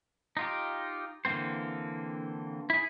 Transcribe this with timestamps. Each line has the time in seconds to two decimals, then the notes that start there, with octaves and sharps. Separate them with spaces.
0.37 D#4 F4 G4
1.25 D3 E3 A#3 C4 C5
2.70 E4 G#4